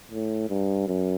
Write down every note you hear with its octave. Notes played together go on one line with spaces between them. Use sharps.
A2
G2
F#2